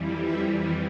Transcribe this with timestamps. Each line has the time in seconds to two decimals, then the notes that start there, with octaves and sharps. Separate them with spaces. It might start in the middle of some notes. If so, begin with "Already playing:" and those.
Already playing: F2 E3 G3
0.20 E5